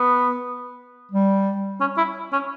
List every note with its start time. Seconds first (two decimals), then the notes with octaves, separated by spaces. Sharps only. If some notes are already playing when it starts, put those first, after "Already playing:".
Already playing: B3
1.11 G3
1.80 C#4
1.97 E4
2.33 C#4